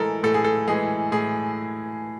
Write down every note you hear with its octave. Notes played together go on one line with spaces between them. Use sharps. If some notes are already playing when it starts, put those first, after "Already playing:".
Already playing: A2 E3 G#3 A4 A#4
A2 A4
G#4
A4
E3 G#3 G#4
A2 G#4